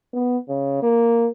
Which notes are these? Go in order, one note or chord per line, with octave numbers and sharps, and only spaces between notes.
B3
C#3
A#3